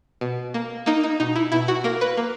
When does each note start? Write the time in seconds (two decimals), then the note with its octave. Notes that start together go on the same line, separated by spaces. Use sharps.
0.21 B2
0.54 A#3
0.86 A#3 D#4
1.04 D#4
1.20 B2 D#4
1.36 E4
1.52 B2 E4
1.68 F#4
1.84 A#3 A#4
2.01 B4
2.17 A#3